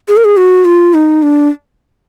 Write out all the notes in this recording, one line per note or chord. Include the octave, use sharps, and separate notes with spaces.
G#4
A#4
G#4
F#4
F4
D#4
D4